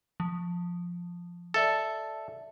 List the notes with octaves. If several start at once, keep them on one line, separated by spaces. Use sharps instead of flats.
F3
A4 D5 E5 A5